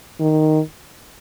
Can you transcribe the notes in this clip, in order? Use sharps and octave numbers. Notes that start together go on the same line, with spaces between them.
D#3